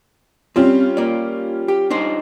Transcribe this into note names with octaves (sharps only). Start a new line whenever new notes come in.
G3 C4 C#4 F4
A#3 D5
G4
D4 D#4 C5